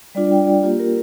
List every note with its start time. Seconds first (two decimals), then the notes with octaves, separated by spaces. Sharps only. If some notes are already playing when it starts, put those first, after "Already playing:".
0.15 G3 D4 F4 D5
0.31 G5
0.47 D5
0.63 A#3 F4 G4
0.79 A#4